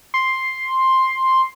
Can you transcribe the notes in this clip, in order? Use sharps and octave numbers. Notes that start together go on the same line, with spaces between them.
C6